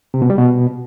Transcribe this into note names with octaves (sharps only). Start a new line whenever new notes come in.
C3
B2
G3
B2